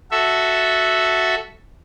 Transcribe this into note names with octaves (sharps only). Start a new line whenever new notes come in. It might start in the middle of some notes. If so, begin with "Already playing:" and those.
F#4 A4 E5